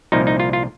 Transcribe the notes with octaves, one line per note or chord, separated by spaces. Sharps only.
C2 A#2 F3 D#4
D#4
F4
F4